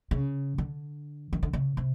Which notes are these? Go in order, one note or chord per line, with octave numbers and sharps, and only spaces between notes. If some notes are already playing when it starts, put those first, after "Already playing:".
C#3
D3
D#3
D3
C#3
C3